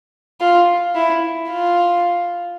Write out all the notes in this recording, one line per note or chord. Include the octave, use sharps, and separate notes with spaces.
F4
E4
F4